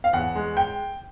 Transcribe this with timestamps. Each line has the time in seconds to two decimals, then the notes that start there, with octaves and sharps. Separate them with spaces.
0.04 F5
0.13 E2 F#5
0.35 G#3
0.57 G5